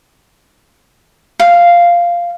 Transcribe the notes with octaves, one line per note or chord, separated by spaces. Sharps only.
F5